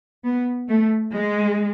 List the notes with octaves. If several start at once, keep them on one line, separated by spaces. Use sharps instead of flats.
B3
A3
G#3